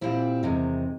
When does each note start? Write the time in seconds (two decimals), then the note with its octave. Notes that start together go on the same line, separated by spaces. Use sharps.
0.01 A#2 G3 C4 E4
0.43 E2 C3 D#3 G#3